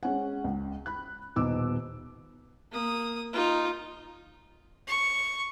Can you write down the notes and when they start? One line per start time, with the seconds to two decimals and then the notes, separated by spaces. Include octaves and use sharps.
0.03 G#3 C#4 F#5
0.44 C#2
0.86 B5 F#6
1.36 D#1 B2 B3 D#4 D6 E6
2.72 A#3 D#6
3.33 D#4 F4
4.88 C#6